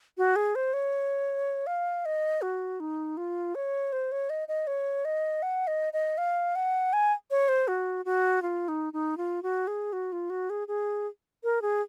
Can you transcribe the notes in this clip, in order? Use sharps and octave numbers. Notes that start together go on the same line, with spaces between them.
F#4
G#4
C5
C#5
F5
D#5
F#4
D#4
F4
C#5
C5
C#5
D#5
D#5
C#5
D#5
F#5
D#5
D#5
F5
F#5
G#5
C#5
C5
F#4
F#4
F4
D#4
D#4
F4
F#4
G#4
F#4
F4
F#4
G#4
G#4
A#4
G#4